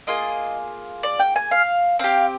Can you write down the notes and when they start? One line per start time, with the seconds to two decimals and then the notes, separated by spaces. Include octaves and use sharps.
0.07 A#3 F4 G#4 D#5
1.03 D5
1.19 G5
1.36 G#5
1.51 F5
1.99 C4 G4 F5